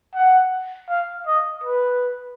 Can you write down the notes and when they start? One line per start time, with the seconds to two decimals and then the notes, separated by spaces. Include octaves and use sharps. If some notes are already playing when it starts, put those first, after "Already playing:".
0.15 F#5
0.89 F5
1.27 D#5
1.64 B4